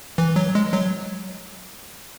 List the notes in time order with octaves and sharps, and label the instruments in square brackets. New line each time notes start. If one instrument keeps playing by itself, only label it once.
[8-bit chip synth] E3
F#3
G#3
F#3